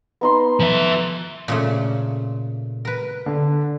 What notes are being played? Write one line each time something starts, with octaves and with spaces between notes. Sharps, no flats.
B3 D#4 C6
F3 E5
A#2 C#3 A3
A#4 B4
D3